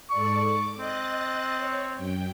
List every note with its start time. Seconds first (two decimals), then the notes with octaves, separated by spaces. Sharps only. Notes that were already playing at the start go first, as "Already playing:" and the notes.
0.10 G#2 A4 D5 C#6
0.45 D6
0.78 C4 D#5 F#6 A6
1.56 C#5
1.95 F#2 G5